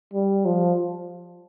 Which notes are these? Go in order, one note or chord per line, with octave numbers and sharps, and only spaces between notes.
G3
F3